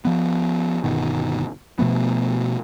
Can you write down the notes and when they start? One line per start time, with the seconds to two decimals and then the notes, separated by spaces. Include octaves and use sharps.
0.05 F3 B3
0.84 G1 B2 D#3
1.79 B2 F3 A3 B3